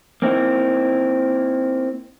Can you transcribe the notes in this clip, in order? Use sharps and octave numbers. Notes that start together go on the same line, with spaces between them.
A#3 C4 D#4 E4